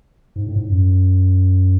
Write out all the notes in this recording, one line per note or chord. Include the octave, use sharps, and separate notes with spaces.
G#2
A2
G#2
F#2